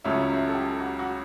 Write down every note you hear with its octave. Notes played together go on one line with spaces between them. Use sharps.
C#2 C#3 F#3 A3 C#4 E5
E5
A4
G4
F#4
F#4